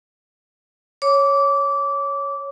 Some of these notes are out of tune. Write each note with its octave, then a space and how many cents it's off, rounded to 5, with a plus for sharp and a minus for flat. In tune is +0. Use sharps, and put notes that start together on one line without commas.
C#5 +0 D6 -20